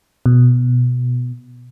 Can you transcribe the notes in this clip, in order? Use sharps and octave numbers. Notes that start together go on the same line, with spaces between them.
B2